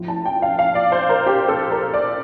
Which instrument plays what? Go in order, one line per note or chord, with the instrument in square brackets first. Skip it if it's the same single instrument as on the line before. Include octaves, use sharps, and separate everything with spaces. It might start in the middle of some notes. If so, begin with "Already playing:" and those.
Already playing: [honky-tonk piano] A2 F3
A5
G5
F5
F5
D5
C5
A#4
G4
A4
A#4
D5